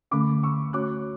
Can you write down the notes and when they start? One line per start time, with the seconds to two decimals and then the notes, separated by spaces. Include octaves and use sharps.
0.11 D3 A3 C#4 B5 D6
0.43 C#6 E6
0.73 A3 C#4 F#4 C#5 D6 F#6